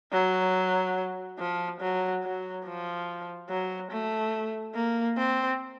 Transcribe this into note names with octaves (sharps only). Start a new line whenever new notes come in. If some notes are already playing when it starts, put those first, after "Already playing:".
F#3
F3
F#3
F#3
F3
F#3
A3
A#3
C4